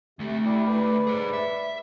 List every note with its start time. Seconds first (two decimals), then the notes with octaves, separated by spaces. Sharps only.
0.19 D2 C3 A3
0.45 E4 G4 D5
0.68 B4 D5
1.07 G#4 C5
1.33 E5